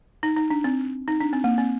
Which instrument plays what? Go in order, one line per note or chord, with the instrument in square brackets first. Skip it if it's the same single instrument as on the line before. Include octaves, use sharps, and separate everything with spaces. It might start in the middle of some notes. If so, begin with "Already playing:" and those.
[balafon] D#4
D#4
D4
C4
D#4
D4
C4
A#3
C4